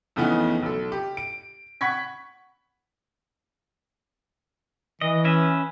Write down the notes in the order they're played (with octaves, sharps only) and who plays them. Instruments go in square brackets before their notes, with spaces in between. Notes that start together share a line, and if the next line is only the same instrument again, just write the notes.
[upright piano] F2 C#3 E3 A3 B3 D#4
B1 A4
G4
D7
F#5 B5 C#6 G#6 B6
[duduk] E3 [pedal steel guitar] D#5
[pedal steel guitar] C#4 B4 E5